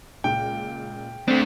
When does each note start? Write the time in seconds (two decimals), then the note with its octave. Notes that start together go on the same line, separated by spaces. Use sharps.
0.24 C#2 A#2 G5
1.28 A3 C4 D4